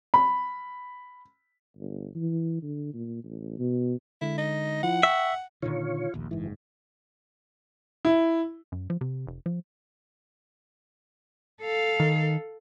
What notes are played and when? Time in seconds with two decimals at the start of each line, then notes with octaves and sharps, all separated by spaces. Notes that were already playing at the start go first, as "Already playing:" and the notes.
0.14 B5
1.77 G1
2.15 E3
2.62 D3
2.93 A#2
3.24 A1
3.58 B2
4.22 D3 G#3 E4
4.38 D#4
4.83 F3 E4 F4 F#5
5.03 E5 G5 C#6
5.62 A#2 D3 D#3 F4 C#5
6.14 A#1 D#2
6.31 F#1 G#2 E3
8.05 E4
8.72 F#2
8.90 F3
9.01 C3
9.27 F1
9.46 F3
11.61 A4 F5
12.00 D#3